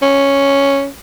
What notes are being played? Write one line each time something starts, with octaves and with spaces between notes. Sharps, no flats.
C#4